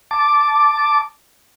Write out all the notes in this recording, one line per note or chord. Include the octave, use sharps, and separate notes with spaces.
A5 D6